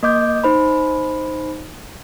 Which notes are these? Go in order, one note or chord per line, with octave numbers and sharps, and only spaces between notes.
A#3 D#5 D6 G6
D#4 C5 B5